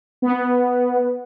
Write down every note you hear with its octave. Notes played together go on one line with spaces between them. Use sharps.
B3